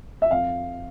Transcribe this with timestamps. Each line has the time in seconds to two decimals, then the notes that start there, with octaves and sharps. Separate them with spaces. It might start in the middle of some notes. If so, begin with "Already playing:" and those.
0.22 E5
0.31 F2 F5